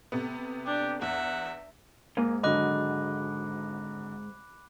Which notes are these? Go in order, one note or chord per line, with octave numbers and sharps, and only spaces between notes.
C3 A3 B3
D4 G4
E2 E5 F#5
G#2 A#3
G#1 D3 F#3 D#5 B5 D6 F#6